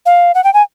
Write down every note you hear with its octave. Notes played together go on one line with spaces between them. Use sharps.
F5
F#5
G5
G#5